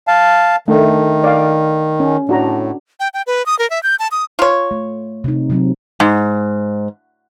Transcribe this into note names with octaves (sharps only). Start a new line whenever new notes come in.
F5 A5
D#3 A3 D4
D5 F5
C#4
A2 D4 F#4 A#5
G5
G5
B4
D#6
A#4
E5
G6
A5
D#6
F4 C#5
A3
C3 D#4
C3 F#3 C4
G#2